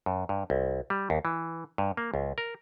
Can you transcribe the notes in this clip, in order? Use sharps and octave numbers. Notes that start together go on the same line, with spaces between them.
F#2
G2
C2
G3
D#2
E3
G2
A#3
C#2
A#4